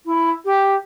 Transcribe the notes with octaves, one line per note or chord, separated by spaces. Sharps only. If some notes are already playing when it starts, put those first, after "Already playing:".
E4
G4